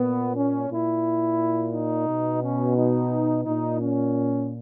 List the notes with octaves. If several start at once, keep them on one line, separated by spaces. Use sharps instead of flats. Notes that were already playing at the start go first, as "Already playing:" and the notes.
Already playing: A#2 B3
C#4
A#2 E4
D#4
B2
C#4
D#4
A#2 D#4
C#4